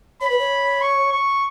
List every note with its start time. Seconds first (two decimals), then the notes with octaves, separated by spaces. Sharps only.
0.21 C#5 B5
0.30 B4
0.39 C#5
0.82 C#6
1.12 C#6